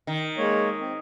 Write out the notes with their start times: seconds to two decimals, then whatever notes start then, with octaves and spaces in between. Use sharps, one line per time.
0.07 D#3
0.37 G#3 A#3 C#5
0.80 C4